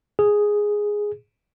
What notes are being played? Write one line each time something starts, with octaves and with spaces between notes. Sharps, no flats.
G#4